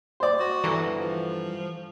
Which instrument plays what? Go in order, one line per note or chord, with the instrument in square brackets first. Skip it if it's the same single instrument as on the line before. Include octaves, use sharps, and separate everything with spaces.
[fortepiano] C5 D5
[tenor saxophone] F#4
[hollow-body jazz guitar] G2 A4 A#5 [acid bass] E3
[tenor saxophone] F3